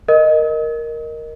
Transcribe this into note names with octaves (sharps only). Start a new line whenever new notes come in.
A#4 D#5